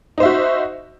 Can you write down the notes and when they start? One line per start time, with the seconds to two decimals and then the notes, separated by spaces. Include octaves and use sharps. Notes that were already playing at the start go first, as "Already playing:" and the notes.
0.18 D#4
0.20 C5
0.23 E5
0.25 F#4